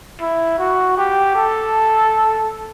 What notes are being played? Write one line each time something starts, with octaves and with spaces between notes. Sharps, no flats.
E4
F#4
G4
A4